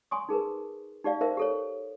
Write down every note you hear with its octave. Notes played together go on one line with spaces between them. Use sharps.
G#5 C6 C#6 D#6
D#4 G#4 A#4 B4
D#4 G4 D5 F5
D#4 A#4 C5 E5 F5
G4 A4 C#5